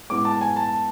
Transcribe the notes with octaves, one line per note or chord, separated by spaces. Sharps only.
A2 G#3 B3 D6
A5
G#5
A5